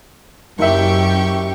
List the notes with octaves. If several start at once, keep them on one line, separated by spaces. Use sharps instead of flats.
F#1 F#2 G4 E5 G5 C#6